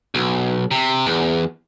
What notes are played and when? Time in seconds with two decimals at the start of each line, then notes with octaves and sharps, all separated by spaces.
0.15 B1
0.71 C3
1.06 E2